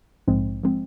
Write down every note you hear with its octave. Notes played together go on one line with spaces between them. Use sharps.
A#1 G#2 F3 G#3 C4
F3 G#3 C4